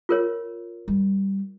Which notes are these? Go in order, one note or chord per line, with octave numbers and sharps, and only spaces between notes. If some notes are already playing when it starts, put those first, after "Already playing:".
F4 A#4 C#5
G3